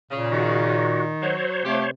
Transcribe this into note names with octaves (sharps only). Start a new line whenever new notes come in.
A#2 C#3
D#3 F#4
F#3 C5 C#5
C3 A3 F4 G4